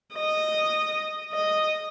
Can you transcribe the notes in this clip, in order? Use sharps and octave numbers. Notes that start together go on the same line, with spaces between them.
D#5
D#5